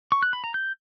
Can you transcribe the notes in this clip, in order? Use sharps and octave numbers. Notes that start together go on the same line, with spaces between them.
C#6
F#6
B5
A#5
G6